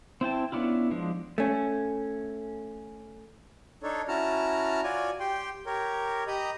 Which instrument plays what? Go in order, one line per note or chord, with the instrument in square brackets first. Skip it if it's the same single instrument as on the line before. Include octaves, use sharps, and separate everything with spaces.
[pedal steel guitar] C4 E4 G5 A5
B3 C#4 D4 E4 F4
F3 G#3 D4
[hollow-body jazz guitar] A3 C#4
[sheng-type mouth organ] D4 D#4 A4 C#5
C#4 E4 F#4 A5 A#5 F6
F4 F#4 C#5 D5 G#5
G4 G5 C6
G4 A#4 C#5
G4 D#5 A#5 B5 D#6